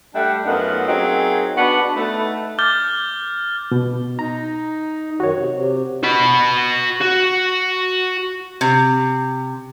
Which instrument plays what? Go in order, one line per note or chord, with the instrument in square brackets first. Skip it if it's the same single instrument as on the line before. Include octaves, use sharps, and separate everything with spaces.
[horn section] G3 A3 D4 E5 F#5 G5
F#2 A3 B3 D#4 F4 F#5
F#3 A#3 C4 D#4 G#4
B3 D4 F#4 F#5 A5 B5
A3 D#4 B4
[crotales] D6 F6 G6 A6 G7
[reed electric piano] B2
[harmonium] D#4 [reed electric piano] A#5
[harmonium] F#2 D#3 [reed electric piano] F#4 C#5
[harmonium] C3
C3
[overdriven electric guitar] F#4 B5
F#4
[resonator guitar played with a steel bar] C3